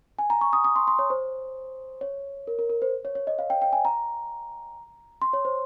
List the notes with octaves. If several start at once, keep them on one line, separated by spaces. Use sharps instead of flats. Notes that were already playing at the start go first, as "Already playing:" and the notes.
G#5
A#5
C#6
D#6
D#6
C6
C6
C#5
C5
C#5
A#4
A#4
A#4
C5
C#5
C#5
D#5
F5
G5
G5
G#5
A#5
C6
C#5
C5